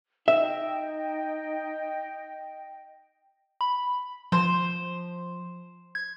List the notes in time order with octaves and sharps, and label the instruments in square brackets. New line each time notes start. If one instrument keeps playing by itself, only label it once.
[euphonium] D#4 [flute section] D#5 G5 [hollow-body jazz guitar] E5
[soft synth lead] B5
[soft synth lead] F3 [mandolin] C5
[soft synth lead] G#6